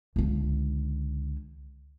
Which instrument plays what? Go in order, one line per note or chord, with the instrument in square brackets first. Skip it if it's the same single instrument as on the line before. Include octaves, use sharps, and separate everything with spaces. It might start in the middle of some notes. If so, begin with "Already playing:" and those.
[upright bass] C#2 D3